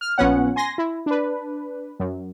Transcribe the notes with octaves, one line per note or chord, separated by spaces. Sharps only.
F6
A#1 F3 B3 C#4 F#5
G#5 C6 A#6
E4
D4 B4
F#2